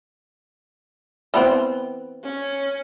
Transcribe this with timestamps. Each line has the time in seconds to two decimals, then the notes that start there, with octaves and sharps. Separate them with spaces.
1.34 E3 B3 C4
2.25 C#4